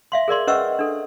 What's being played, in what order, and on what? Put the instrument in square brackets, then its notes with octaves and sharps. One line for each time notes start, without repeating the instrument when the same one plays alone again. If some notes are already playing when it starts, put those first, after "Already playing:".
[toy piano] E5 F5 C6
G#4 A#4 D5 C6
C#4 B4 D#5 F#5 C#6 E6
D4 A4